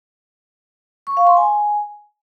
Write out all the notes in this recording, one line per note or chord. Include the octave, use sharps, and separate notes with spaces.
C#6
F5
C6
G#5